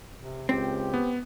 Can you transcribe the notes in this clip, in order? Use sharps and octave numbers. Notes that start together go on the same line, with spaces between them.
C3
C#2 C4 G4
B3